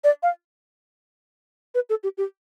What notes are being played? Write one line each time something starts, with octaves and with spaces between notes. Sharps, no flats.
D5
F5
B4
A4
G4
G4